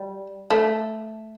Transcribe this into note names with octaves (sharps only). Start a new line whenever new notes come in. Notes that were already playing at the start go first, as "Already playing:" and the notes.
Already playing: G3
A3